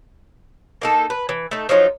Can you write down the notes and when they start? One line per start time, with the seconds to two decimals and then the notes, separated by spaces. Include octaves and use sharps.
0.81 A#3 D#4 A4
1.10 B4
1.29 E3
1.51 A3 D#4
1.69 F3 F#3 D#4 F4